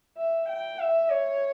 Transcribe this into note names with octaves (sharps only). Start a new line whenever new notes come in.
E5
G5
E5
C#5